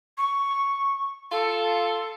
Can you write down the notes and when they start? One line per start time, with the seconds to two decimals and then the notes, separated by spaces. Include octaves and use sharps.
0.18 C#6
1.31 F4 A4